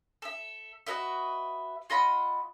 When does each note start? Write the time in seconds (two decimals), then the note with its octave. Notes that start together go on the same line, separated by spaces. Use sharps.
0.22 A4 E5
0.87 F#4 B4 D#5 E5
1.90 F4 D#5 F#5 B5